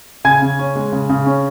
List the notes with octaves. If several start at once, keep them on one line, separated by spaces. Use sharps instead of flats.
C#3 G#5 G#6
C#3
C#4
G#3
C#3
C#3
C#4